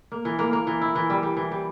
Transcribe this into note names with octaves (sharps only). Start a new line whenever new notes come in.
A#3
E3
A#3
A#3
E3
E4
E3
G3
G3
E3
G3